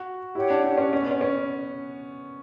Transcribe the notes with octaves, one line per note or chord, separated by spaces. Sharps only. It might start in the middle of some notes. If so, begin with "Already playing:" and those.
Already playing: F#4
E4 G4 C#5 F#5
D4
D4
C#4
C#4
B3
C#4
C#4